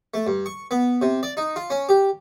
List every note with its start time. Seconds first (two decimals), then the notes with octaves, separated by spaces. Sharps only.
0.14 A3
0.27 G2
0.46 C#6
0.71 B3
1.02 C3
1.23 D5
1.37 D#4
1.56 F4
1.70 C#4
1.89 G4